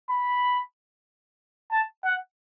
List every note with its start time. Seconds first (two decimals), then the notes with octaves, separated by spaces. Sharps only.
0.10 B5
1.71 A5
2.05 F#5